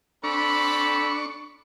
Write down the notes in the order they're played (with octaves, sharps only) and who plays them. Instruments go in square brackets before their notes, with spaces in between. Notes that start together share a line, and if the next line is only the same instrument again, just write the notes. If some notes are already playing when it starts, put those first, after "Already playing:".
[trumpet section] C4 A4 B5 [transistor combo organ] D4 C#6